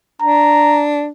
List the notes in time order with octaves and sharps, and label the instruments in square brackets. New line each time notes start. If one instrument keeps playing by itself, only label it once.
[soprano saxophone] D4 [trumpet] A#5